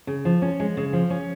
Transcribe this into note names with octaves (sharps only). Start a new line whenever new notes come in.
C#3
F3
C#4
G#3
C#3
F3
C#4